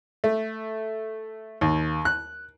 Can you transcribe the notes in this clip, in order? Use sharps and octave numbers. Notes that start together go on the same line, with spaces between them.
A3
D#2
F#6